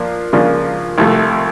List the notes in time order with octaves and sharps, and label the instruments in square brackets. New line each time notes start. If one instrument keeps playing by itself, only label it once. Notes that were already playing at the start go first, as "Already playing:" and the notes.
Already playing: [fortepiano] F3 A#3 D4
C#3 F3 A#3 D4
C2 C3 F3 A3